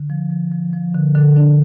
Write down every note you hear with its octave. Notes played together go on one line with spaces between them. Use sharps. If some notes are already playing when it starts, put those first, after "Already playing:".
Already playing: D3
F3
F3
F3
F3
D3
D3
D4